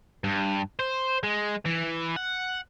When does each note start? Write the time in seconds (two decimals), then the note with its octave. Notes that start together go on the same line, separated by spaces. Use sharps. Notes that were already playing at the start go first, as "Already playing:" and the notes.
0.24 G2
0.80 C5
1.24 G#3
1.66 E3
2.16 F#5